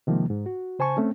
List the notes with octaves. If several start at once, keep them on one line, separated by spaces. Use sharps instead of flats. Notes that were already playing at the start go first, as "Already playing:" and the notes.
C3 D#3 F3 G#3 A#3
G#2
F#4
C#3 C5 G#5 A5 C#6
A3 C4 C#4